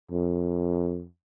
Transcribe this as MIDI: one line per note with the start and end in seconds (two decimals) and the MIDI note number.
0.11 1.06 41